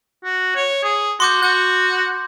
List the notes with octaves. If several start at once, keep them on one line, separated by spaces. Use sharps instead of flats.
F#4
C#5
G#4
F#4 C6 D6 G6
F#4 G6